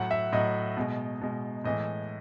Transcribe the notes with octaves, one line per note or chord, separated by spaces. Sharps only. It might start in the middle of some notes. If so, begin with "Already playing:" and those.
Already playing: A2 F#3 F#5
E5
A2 F#3 D#5
B2 G#3
B2 G#3
A2 E3 G#3 D#5